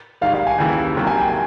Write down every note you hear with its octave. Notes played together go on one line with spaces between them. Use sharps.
G#2 D#3 G3 F5
F5
G#5
D#2 C#3 E3 G5
C3 D#3 F#3 A#3
G#5
G5
G#5